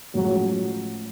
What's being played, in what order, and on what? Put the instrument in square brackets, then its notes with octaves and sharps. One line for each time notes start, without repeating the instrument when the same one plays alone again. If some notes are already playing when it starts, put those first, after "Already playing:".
[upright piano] A2 F3 G#3 C#4 [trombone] F#3